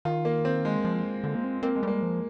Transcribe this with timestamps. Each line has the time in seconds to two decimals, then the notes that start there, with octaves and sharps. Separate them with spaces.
0.05 D#3 F4
0.25 A#3
0.45 C4
0.65 G#3
0.85 F3
1.24 D3
1.35 A#3
1.44 C4
1.63 A#3 C4
1.75 G#3
1.83 G3 A#3
2.02 F3